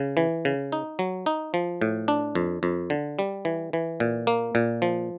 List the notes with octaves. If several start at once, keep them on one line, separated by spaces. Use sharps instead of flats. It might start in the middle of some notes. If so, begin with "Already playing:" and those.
Already playing: C#3
E3
C#3
D#4
F#3
D#4
F3
A2
D4
F2
F2
D3
G3
E3
E3
A#2
A#3
A#2
F3